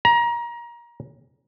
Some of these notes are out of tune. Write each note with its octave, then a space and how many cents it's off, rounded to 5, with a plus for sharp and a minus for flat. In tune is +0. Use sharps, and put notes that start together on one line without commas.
A#5 +25